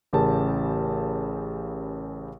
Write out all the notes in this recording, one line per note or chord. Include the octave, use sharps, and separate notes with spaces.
A1 C#3 G4 A#4 A5